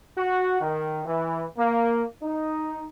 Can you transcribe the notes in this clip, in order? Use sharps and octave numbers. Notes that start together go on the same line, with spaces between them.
F#4
D#3
E3
A#3
D#4